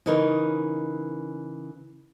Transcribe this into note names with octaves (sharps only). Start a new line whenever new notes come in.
C#3 E3 D#4 A#4 C#5